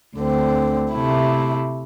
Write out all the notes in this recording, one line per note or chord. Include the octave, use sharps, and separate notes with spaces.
D2 D3 C4
C3 A3 E4